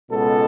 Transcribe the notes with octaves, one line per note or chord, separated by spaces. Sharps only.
C#2 B2 G#3 B3 A4